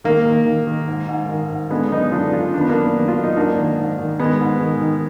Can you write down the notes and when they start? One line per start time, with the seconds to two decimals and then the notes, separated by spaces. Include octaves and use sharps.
0.04 D#3 A#3
0.26 D#3
0.46 D#3
0.67 D#3
0.88 G#2
1.09 G#2
1.29 D#3
1.50 G#2
1.70 D3 G#3 B3
1.91 F#2 B3 D#4
2.12 D3 D4 F4
2.33 D3 D4 F4
2.54 D#3 D4
2.61 B3
2.68 A#3 D4
2.74 F#2
2.96 D#3
3.08 F4
3.16 F#2
3.23 D#4
3.37 G#2 A#3 D4
3.58 D#3
3.78 G#2
3.99 D#3
4.19 D#3 G#3 B3
4.41 G#2
4.61 D#3
4.82 D#3